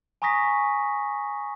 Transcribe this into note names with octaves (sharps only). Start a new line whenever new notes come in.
G#5 A#5 C#6 D#6 A#6 B6